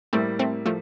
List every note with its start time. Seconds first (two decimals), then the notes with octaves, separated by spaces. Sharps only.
0.13 A2 G3 A3 A#3 C4 E4
0.39 A3 C4
0.66 F3 A3